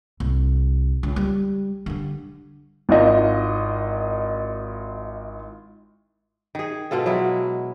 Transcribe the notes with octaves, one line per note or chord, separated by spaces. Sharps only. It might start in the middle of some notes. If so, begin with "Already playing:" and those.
C2
C#2
G3
D3 G3
G#1 E4 F4 D#5
D#3 G#4
B2 G#3 F4 A4
F#3 G#3 E4